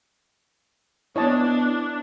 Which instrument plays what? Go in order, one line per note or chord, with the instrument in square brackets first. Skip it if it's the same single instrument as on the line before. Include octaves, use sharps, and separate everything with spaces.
[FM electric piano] B3 E4 [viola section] D4 [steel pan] C#5 D#5 A5